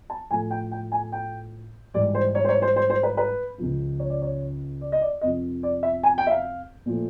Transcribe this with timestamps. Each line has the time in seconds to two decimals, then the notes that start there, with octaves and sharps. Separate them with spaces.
0.10 A5
0.31 A2 F3 A3 G#5
0.51 G5
0.71 G5
0.92 G#5
1.12 G5
1.94 G#2 E3 G3 D5
2.15 C5
2.35 C#5
2.44 C5
2.49 C#5
2.62 C5
2.76 C5
2.90 C5
3.03 B4
3.17 B4
3.58 C#2 C#3 F3
3.99 C#5
4.10 D5
4.21 C#5
4.81 D5
4.92 D#5
5.01 D5
5.21 F2 C3 F3 D#5
5.63 D5
5.83 E5
6.03 G#5
6.18 G5
6.27 E5
6.30 F5
6.86 A#2 F3 A3